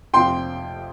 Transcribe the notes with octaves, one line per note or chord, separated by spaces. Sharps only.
F2 C3 F3 G5 C6